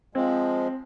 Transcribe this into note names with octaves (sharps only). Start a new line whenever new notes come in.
F3 G#3 C4